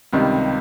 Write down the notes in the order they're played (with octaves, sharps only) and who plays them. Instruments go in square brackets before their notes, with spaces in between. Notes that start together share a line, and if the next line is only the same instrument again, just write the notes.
[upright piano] C#2 C3 D#3 G3